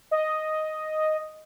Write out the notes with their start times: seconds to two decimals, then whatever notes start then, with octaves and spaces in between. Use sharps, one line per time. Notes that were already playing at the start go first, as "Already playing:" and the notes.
0.11 D#5